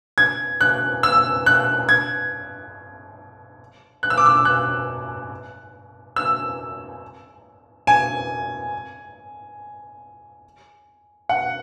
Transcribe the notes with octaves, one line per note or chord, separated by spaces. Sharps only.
G#6
F#6
E6
F#6
G#6
F#6
E6
D6
E6
F#6
E6
G#5
F#5